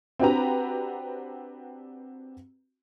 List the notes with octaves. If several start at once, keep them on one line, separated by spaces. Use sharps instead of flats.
C4 D4 F#4 G4 B4 A#5